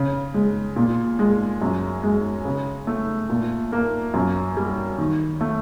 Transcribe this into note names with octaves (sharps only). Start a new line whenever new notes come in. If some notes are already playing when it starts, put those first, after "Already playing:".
Already playing: C#3
G#3
A#2
G#3
F#2
G#3
C#3
A3
A#2
A#3
F#2
G3
D#3
A3